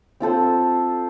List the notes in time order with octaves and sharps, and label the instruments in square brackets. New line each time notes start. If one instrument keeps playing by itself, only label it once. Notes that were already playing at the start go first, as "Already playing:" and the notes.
[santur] C4 F4 A4 C5